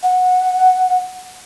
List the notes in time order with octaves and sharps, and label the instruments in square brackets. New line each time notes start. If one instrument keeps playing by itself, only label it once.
[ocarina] F#5